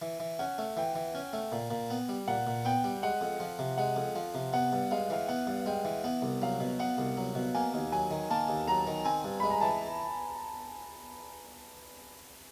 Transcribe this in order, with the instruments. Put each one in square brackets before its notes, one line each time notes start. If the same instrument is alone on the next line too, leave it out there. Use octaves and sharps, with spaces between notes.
[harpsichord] E3
E3
[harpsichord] C#4 [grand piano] F#5
[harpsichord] A3
[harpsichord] E3 [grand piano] G5
[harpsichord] E3
C#4
A3
A#2
A#2
B3
G3
[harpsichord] A#2 [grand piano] F#5
[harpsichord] A#2
[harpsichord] B3 [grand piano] G5
[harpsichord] G3
[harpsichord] G#3 [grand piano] F#5
[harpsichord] F2
F3
C3
[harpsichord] G#3 [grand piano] F#5
[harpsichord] F2
F3
C3
[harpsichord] B3 [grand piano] F#5
[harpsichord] G2
[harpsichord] G#3 [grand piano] F5
[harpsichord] E3 [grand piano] F5
[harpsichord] B3 [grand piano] F#5
[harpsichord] G2
[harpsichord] G#3 [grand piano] G5
[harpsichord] E3
[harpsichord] B3 [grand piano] F#5
[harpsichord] C2
[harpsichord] F#3 [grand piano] F5
[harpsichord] B2
[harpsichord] B3 [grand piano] F#5
[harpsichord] C2
F#3
B2
[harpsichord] A#3 [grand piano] G#5
[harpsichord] D#2
[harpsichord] F#3 [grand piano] G#5
[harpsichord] D#3
[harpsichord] A#3 [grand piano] A5
[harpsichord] D#2
[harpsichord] F#3 [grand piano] A#5
[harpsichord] D#3
[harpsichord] C4 [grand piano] G#5
[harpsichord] G2
[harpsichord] G#3 [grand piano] B5
[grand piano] A#5
[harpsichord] E3 [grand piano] A5